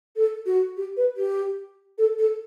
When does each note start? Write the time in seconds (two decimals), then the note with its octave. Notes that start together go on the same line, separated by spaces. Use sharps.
0.16 A4
0.46 F#4
0.77 G4
0.97 B4
1.17 G4
1.98 A4
2.19 A4